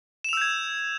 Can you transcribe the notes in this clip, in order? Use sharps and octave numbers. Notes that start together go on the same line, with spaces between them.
E6 G6 G#6 E7 F7